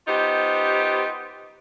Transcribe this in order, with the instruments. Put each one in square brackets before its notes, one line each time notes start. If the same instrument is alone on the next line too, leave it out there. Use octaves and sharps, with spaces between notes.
[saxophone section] B3 D#4 F4 G4 C5